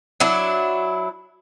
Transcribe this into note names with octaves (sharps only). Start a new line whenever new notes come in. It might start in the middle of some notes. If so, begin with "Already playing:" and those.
F#3 D4 E4